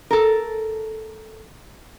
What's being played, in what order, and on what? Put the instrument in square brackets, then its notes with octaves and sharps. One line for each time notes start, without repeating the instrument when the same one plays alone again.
[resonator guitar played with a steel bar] A4 A#4